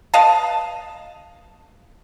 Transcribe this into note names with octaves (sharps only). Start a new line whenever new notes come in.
B4 D#5 F5 A5